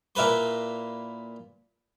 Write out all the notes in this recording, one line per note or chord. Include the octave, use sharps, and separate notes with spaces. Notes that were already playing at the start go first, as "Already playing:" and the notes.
A#2 E4 A#4 B4 C6